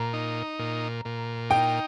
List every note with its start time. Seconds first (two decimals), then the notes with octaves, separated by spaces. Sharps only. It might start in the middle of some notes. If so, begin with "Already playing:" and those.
Already playing: A#2 A#5
0.13 D#4
0.59 A#2
1.05 A#2
1.50 D#4 G5